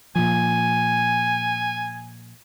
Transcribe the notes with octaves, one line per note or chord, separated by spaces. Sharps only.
A#2 F3 G#5